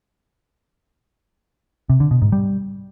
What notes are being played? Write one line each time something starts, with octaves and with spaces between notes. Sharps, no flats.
C3
D3
B2
G#2
G3